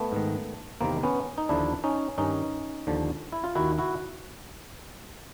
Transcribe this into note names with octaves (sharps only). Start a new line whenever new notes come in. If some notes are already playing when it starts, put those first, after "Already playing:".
Already playing: A3 B3
G#2 D#3
E2 C3 D#3 A#3 C4
B3 C#4
D#4
D#2 D3 F3 D4 E4
C#4 D#4
G2 D#3 C#4 D#4
D#2 D3 F3
E4
F4
D#2 D#3 E4 F#4
E4 F#4